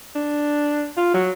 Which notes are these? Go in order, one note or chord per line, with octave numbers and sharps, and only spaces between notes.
D4
F4
F#3